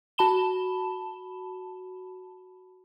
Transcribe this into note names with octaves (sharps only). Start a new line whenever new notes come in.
F#4 A5 B5 E7 G7